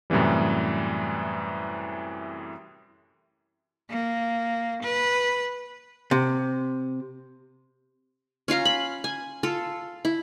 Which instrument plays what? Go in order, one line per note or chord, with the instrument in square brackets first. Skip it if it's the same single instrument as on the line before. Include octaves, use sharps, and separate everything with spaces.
[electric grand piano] F#2 A2 C3 E3 G3
[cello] A#3
B4
[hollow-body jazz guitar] C3
[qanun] C#4 F4 F5 A#5
B5
G#5
F4 A4
E4